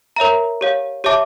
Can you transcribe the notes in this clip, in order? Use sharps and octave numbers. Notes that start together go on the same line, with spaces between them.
A#4 C#5 E5 A#5
G4 C#5 F5
G4 C#5 E5 A5 D6